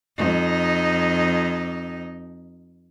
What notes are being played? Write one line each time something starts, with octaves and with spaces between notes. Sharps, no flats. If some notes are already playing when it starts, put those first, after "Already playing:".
F2 D#4